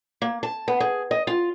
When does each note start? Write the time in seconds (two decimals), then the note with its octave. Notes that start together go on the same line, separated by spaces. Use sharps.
0.22 A#3
0.43 A5
0.68 B3
0.80 G#4
1.11 D#5
1.27 F4